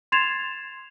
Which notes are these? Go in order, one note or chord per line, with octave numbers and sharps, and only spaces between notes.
C6 G#6 A6 C7 E7 F7